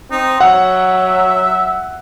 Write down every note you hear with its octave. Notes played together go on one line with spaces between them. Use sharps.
C4 D#4
F#3 E5 F#5